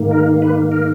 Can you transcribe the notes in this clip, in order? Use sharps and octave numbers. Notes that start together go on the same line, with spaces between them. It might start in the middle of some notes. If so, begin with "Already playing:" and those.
Already playing: G#2 D#3 A#3
A#4
B4
A#4